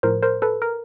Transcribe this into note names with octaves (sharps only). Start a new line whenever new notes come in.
A2 F3 A#4 C5
A#4 C5
A4 B4
A#4